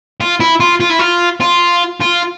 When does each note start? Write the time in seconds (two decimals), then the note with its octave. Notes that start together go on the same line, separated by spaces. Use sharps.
0.20 F4
0.40 E4
0.60 F4
0.80 F4
0.90 E4
0.99 F4
1.40 F4
2.00 F4